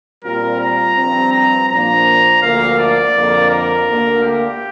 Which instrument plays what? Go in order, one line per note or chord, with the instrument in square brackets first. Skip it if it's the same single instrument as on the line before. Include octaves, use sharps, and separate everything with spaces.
[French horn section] A#2 G3 C4 F4 [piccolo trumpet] A#4
[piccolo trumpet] A#5
[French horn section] G2 F3 C4
[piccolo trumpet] A#5
[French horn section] A#2 F3 A#3 D4 [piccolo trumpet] A#5
[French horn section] D2 D3 F3 A#3 [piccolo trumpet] F5
[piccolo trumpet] D5
[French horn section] F2 D3 A#3
[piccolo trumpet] A#4
[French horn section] D2 D3 A#3
[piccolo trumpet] G4